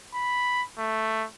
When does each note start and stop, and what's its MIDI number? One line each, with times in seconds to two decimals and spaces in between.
0.14 0.63 83
0.78 1.25 57